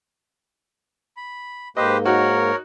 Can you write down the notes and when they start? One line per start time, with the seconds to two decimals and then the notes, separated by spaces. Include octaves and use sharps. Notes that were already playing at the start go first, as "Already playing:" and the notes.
1.17 B5
1.77 G#2 A#3 G4 B4 C5 D#5
2.05 D#4 F#4 A#4 C#5